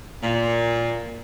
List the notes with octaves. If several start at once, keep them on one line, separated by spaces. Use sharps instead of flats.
A#2